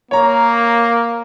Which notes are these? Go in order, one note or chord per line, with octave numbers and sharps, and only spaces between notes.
A#3 C#5 A#5